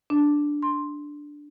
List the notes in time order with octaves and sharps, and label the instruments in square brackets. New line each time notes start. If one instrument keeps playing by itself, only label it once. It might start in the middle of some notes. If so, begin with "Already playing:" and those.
[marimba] D4
C6